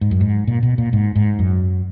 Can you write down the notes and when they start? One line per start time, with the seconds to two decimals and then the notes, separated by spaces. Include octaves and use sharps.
0.01 G#2
0.11 F#2
0.21 G#2
0.47 A#2
0.63 B2
0.78 A#2
0.93 G#2
1.16 G#2
1.39 F#2